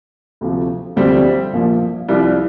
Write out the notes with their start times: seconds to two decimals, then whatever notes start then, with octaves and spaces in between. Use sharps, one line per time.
0.41 D2 C3 F3
0.96 D2 D3 F3 G3 C4
1.53 A#1 A#2 F3
2.08 C2 C3 F3 G3